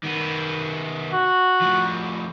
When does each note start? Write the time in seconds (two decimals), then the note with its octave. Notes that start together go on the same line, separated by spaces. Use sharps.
0.04 D#3 B3
1.13 F#4
1.62 A2 F3